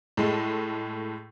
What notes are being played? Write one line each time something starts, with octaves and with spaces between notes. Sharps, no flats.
A2 G#3 A3